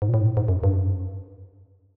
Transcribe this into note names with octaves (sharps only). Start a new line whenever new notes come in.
G#2
A#2
A2
G#2
A2
G#2
F#2
G2
F#2